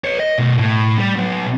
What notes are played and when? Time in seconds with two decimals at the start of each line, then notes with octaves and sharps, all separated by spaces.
0.04 B4 C#5
0.19 D#5
0.38 B2 A#4
0.58 A2
0.98 G3
1.16 B2 F#3